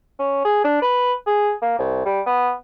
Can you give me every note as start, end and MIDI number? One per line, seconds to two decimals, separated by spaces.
0.19 0.40 61
0.44 0.59 68
0.64 0.81 62
0.82 1.13 71
1.26 1.53 68
1.62 1.78 58
1.79 2.05 36
2.05 2.21 55
2.26 2.52 59